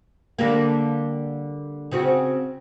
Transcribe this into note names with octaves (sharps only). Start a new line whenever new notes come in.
D3 G3 A#3
C#3 C4 F#4